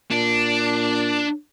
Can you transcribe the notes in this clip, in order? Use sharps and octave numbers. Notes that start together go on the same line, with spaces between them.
A#2 D4